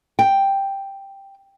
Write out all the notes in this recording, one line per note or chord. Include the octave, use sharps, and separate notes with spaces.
G5